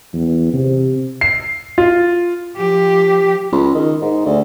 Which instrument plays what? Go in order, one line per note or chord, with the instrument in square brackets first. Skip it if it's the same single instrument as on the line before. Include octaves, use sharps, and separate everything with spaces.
[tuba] E2
C3
[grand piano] C7
F4
[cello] F3 G4
[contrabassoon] C#2
D#3
G#2
D2